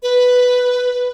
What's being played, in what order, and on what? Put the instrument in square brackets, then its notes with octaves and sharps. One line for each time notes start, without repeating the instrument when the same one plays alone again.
[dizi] B4